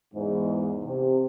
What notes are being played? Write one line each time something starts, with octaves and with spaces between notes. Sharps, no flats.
E2 G#2
C3